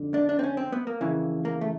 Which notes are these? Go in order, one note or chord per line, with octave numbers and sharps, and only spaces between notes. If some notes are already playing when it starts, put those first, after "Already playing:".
Already playing: F2 D3
D4
D4
C4
C#4
C4
B3
A#3
F2 C#3 E3
A#3
A3